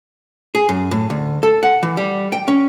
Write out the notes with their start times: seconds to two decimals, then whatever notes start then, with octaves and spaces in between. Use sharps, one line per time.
0.55 G#4
0.69 F#2
0.91 A2
1.10 D2
1.43 A4
1.63 F#5
1.83 E3
1.97 G3
2.32 G5
2.48 C#4